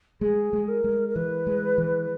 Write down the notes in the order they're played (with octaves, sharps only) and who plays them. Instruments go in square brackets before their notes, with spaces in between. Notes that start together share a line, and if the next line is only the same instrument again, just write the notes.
[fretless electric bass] G#3 [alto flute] G#4
[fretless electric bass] G#3
[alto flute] A#4
[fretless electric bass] G#3
[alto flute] A#4
[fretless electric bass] E3 [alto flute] B4
[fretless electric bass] G#3
E3